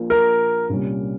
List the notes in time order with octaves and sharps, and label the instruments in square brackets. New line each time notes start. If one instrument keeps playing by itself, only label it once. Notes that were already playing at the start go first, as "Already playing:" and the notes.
Already playing: [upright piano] A#1 A#2 F3 A#3
[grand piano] A#4
[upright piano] C2 A#2 G3 C#4